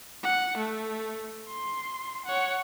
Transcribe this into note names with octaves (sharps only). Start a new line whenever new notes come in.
F#5
A3
C6
C#5 F#5